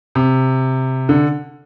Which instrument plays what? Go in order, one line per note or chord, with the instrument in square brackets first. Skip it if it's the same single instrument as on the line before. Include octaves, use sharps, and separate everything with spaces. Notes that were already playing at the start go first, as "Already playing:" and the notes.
[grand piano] C3
D3